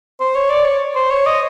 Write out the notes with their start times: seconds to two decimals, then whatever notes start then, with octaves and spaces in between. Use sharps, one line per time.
0.20 C5
0.35 C#5
0.50 D5
0.65 C#5
0.95 C5
1.11 C#5
1.26 D#5